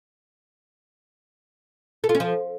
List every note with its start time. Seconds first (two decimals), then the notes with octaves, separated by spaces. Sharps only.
2.04 A4
2.09 F4
2.15 C#4
2.20 F3